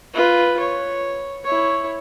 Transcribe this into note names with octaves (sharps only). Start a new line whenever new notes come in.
F4 B4
C#5
E4 C#5